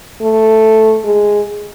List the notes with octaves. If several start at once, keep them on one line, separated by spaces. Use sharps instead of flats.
A3
G#3